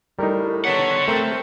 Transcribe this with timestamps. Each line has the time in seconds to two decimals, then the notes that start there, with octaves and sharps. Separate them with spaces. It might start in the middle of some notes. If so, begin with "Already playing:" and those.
0.19 A2 G3 D#4 A#4
0.65 B3 A4 C#5 F#5
1.08 A3 C4 A#4